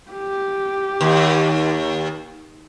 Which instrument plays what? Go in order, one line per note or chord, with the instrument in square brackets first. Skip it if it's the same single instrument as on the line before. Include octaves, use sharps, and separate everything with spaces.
[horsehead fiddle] G4
[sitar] D#2